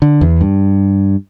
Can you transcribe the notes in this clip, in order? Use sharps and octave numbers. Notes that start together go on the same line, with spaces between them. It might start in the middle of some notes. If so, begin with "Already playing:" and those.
D3
E2
G2